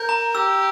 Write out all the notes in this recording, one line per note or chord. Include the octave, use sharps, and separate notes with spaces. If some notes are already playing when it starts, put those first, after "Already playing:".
Already playing: A#4 G6
A#5
G4 E6